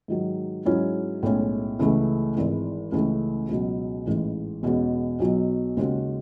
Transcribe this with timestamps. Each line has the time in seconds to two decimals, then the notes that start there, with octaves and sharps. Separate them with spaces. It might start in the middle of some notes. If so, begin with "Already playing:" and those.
0.08 G#2 D#3 F#3
0.66 G#2 F#3 C#4 E4
1.23 B1 A2 G#3 C#4
1.79 C#2 C#3 E3 A3
2.36 G#1 G#2 E3
2.92 C#2 C#3 E3 A3
3.49 C#2 B2 F#3
4.06 A1 G#2 E3
4.63 E2 B2 G#3 C#4 F#4
5.20 B1 B2 F#3
5.77 D#2 C#3 G#3 C#4 F#4